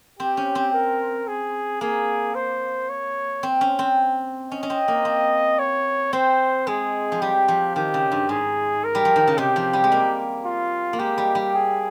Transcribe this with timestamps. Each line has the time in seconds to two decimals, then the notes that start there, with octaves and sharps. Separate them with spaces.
0.19 C4 G4
0.37 C#4
0.55 C4
0.73 A#4
1.27 G#4
1.81 A#3 G#4
2.35 C5
2.89 C#5
3.43 C4
3.61 C#4
3.79 C4
4.51 C#4 D#5
4.63 C#4
4.70 C4
4.88 A#3
5.05 C4
5.59 C#5
6.13 C4 C5
6.67 G#3 G#4
7.12 F3
7.21 G3 G4
7.48 F3
7.75 D#3 G4
7.94 C#3
8.12 G2
8.29 G#2 G#4
8.84 A#4
8.95 G3
9.05 F3
9.16 D#3
9.27 C#3
9.38 C3 G4
9.56 F3
9.73 G3
9.84 G#3
9.92 A#3
10.46 F4
10.93 A#3
10.99 G#3 G4
11.18 G3
11.35 G3
11.54 G#4